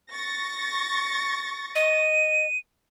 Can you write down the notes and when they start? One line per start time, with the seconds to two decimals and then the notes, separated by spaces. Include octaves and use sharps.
0.11 C#6 A6 A#6
1.75 D#5 D#7